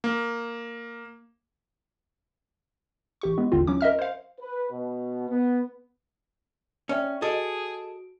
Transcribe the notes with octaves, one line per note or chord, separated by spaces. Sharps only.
A#3
A1 G4 C#6
G#3 B3
A1 D#2 D3 C4 F4
F#3 C#4 D6
A#4 D#5 E5 F6
C5 F5
B4
B2
B3
C#4 D5 E5 G5
F#4 G#4 A4 D#5 D7